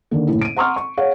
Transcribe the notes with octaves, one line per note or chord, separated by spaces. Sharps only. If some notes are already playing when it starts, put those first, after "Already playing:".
D3 D#3 A#3
F#1 A2 E4
D7 D#7
F#5 A#5 C6 C#6 D#6 F6
C#6
G#4 C#5 F5 F#5